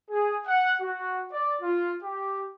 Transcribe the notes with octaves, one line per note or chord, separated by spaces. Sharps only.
G#4
F#5
F#4
D5
F4
G4